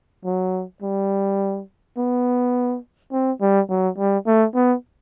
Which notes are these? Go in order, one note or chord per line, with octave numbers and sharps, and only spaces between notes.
F#3
G3
B3
C4
G3
F#3
G3
A3
B3